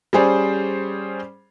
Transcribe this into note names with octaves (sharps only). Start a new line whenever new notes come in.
G3 C#4 G#4 C5 D5